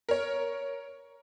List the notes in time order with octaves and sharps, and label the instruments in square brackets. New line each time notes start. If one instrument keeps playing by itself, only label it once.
[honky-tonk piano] A#4 C#5